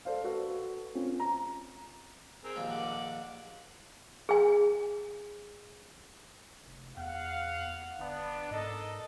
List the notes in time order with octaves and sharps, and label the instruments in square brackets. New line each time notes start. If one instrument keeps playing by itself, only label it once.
[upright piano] A4 C5 D5 F5
F#4 A4 B4
C4 C#4 F4
A#5
[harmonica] C4 G#4 A#4
[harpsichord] A#1 D#2
[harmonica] F#5 D6
[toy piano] G#4 G#5
[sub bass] F1
[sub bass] E2 [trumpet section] F5 F#5
[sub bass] G1 [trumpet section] B3 D4
[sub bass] G#2 [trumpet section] A4 A#4 D#5